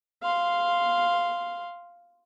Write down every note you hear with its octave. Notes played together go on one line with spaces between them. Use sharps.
F5 C6